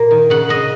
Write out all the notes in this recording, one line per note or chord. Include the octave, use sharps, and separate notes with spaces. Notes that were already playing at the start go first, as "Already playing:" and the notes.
Already playing: A#2 A#3
D#3
C#3 F#5
C#3 D#5